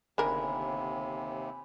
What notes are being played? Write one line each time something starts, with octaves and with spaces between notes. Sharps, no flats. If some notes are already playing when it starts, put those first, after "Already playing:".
G1 D#2 C3 D4 A#4 G#5 B5